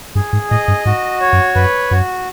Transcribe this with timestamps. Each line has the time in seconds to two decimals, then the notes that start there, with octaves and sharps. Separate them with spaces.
0.15 G2 G#4
0.33 G#2
0.50 A2 D#5
0.68 G2
0.85 G#2 F#4
1.21 C#5
1.33 F#2
1.55 F#2 B4
1.91 F#2 F#4